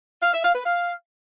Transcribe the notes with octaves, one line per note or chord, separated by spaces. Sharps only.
F5
E5
F5
B4
F5